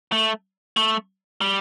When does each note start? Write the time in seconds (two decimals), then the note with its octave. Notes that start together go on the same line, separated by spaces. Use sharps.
0.12 A3
0.77 A3
1.41 G3